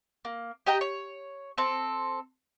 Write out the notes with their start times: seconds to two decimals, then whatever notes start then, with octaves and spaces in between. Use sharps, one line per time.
0.25 A#3
0.66 G4 D#5 G5 A#5
0.81 C#5
1.58 C4 A4